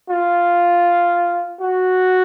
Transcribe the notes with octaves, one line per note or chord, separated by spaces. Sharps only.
F4
F#4